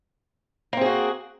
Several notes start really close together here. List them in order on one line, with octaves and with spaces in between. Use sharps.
A#3 C4 G#4 F#4